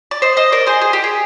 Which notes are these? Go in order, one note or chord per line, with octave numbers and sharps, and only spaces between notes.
D5
C5 D#5
C5 D#5
A#4 D5
G#4 C5
G#4
G4
G#4